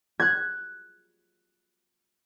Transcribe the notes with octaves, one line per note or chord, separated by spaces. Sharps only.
F#6 G#6